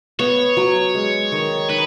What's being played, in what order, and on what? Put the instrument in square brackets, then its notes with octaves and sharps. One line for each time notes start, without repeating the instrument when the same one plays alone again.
[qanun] B3 [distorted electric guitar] C#5
[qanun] F#3
G#3
D#3
[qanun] D#4 [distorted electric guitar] B4